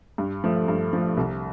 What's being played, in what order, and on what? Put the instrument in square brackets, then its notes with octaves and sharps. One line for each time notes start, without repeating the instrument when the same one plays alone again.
[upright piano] G2
F3 A3
G2
F3 A3
C2